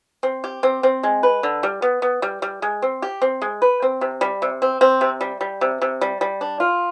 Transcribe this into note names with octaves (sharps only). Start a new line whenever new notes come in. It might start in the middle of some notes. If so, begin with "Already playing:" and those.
C4
G4
C4
C4
G#3
B4
D3
G3
B3
B3
G3
G3
G#3
C4
G4
C4
G#3
B4
C4
C3
G3
C3
C4
C4
C3
G3
G3
C3
C3
G3
G3
D4
F4